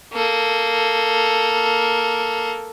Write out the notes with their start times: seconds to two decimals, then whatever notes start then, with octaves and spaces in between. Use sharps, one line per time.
0.13 A#3 A4